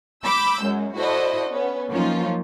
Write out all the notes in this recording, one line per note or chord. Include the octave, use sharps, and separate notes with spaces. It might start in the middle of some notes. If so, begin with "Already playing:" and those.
B5 D6 E6 G6
F#2 G#3
E4 F#4 A4 C5 D5 D#5
B3 C#4
F3 F#3 A#3 C#4 D#4 F4